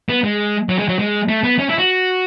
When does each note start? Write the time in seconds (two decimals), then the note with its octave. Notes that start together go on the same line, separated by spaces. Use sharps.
0.09 B3
0.24 G#3
0.69 F#3
0.79 G#3
0.89 F#3
0.99 G#3
1.29 A3
1.44 B3
1.59 C#4
1.69 E4
1.78 F#4